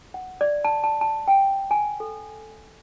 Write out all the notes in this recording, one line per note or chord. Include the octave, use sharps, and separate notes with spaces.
F#5
D5
A5
A5
A5
G5
G#5
A4